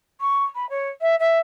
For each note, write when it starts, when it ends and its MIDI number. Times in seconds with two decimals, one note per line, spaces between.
0.20 0.44 85
0.55 0.68 83
0.69 0.89 73
1.01 1.15 76
1.20 1.39 76